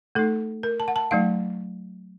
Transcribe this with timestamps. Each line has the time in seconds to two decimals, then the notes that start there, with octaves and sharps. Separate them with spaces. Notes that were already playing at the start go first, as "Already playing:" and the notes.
0.15 A3 D#4 A4
0.63 A#4
0.80 A5
0.88 F#5
0.96 A5
1.11 F#3 A3 D#4 F5